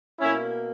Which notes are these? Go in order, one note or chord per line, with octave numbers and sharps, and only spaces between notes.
B2 A#3 C#4 E4